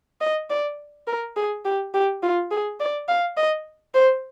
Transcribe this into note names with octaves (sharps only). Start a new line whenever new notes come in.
D#5
D5
A#4
G#4
G4
G4
F4
G#4
D5
F5
D#5
C5